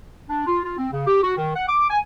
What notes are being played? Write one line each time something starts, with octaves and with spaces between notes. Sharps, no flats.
D4
F4
F4
C4
C#3
G4
F#4
D#3
F#5
D6
G#5